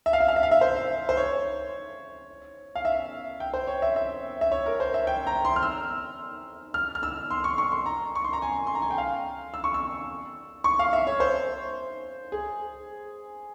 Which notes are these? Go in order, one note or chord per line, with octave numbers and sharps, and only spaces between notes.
E5
F5
E5
F5
E5
F5
E5
C5
C5
C#5
F5
E5
G5
C5
C#5
E5
E5
E5
C#5
A#4
C5
E5
G5
A#5
C6
F6
E6
F6
F6
E6
C6
C#6
C#6
C6
A#5
C#6
C6
A#5
G#5
C6
A#5
G#5
G5
F5
E6
C#6
E6
C#6
F5
E5
C#5
C5
G#4